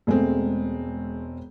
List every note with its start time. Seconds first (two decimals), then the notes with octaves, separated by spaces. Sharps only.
0.07 E1 G#3 A3 C4